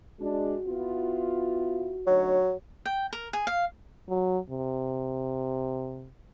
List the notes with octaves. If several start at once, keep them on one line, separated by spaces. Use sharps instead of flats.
G#3 D4 F#4
B3 E4 F4
D2 F#3 D#4 C#5
G5
A#4
G#4
F5
F#3
C3